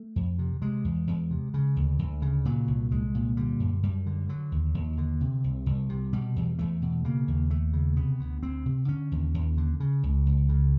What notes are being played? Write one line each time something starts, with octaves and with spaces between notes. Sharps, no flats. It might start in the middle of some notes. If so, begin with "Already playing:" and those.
Already playing: A3
F2
C3
C3 G#3
E2
E2
C3
C#3
D2
D2
C#3
A#2 F#3
C2
C2 G#3
A#2
D3 G3
F#2
F#2 G3
D3
D3 F#3
D#2
D#2
D3
C3
C2
C2
C3
B2 G3
E2
E2 A3
B2
C#3 A#3
D#2
D#2 A3
C#3
C3 B3
D2
D2 C4
C3
D3 C#4
D#2
D#2
D3
C#3
C#2
C#2
C#3